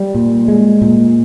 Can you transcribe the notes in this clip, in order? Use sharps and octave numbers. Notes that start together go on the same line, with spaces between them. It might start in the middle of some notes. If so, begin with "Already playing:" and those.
Already playing: G3
A#2
G#3
A#2